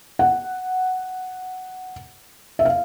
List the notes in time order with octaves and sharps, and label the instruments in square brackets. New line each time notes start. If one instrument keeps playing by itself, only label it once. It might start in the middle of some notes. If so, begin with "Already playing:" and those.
[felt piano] F#5
E5
F5